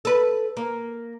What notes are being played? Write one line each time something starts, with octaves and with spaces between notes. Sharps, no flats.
A4 B4
A#3